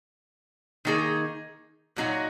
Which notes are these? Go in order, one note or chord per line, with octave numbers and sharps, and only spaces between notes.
D#3 A#3 D#4 G#4
A#2 F#3 D#4 F#4